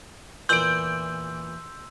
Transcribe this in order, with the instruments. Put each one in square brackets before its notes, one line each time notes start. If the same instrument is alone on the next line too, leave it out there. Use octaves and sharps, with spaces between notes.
[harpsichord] E2 A#2 E3 [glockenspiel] C6 E6 F#7 [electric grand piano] G6 D7